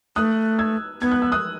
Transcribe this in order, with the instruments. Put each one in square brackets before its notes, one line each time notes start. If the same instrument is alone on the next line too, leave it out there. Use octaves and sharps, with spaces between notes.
[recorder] A3 [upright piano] D#6 F#6
[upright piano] E6 G#6
[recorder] B3 [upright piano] G#6
[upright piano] F#6
E6
D#6 F#6